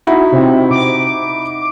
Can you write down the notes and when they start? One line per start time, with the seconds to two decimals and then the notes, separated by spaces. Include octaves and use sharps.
0.07 D#4 E4 F#4
0.32 C3
0.71 D6